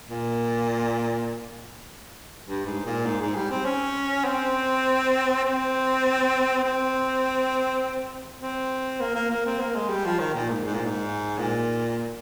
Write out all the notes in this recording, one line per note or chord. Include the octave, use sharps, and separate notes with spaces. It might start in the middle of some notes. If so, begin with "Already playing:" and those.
A#2
G2
G#2
A#2
G#2
G#2
G3
C4
C#4
C4
C4
C4
C4
A#3
A#3
A#3
C4
A#3
G#3
G3
F3
D#3
A#2
G#2
G#2
A#2
G#2
A#2